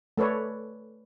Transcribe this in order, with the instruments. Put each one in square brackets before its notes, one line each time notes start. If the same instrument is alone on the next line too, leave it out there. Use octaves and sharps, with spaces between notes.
[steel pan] A3 A4 B4 C#5 D5